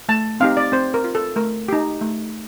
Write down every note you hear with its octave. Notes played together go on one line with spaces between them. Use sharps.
A3 A5
C4 D#4 G4 F5
D5
C4 C5
A#4
F4
A4
A3 A#4
D#4 G4
A3